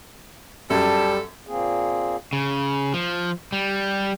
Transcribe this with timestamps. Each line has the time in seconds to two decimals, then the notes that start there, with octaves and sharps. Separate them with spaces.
0.70 F#2 G3 A4 A5
1.47 A#2 A#3 C4 G#4
2.33 C#3
2.94 F3
3.52 G3